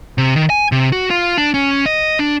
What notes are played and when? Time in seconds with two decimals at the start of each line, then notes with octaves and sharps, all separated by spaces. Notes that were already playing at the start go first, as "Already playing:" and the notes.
0.18 C3
0.36 D#3
0.50 G#5
0.72 C3
0.92 F#4
1.10 F4
1.38 D4
1.54 C#4
1.86 D#5
2.19 D4